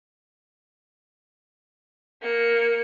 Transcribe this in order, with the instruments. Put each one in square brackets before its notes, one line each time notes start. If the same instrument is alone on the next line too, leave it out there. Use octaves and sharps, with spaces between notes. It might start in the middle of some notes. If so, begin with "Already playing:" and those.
[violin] A#3 C#7